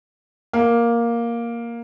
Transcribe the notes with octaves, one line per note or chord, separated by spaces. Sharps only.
A#3